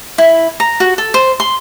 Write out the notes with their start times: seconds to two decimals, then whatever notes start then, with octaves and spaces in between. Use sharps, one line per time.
0.18 E4
0.60 A#5
0.80 F#4
0.98 A4
1.14 C5
1.40 C6